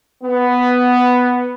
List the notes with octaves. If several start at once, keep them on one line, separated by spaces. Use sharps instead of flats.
B3